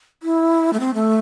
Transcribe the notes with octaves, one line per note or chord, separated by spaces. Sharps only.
E4
A3
C4
A3